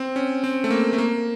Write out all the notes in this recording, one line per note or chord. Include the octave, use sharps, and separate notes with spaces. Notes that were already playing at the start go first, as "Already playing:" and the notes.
Already playing: C4
C#4
C4
A3
A#3
A3
A#3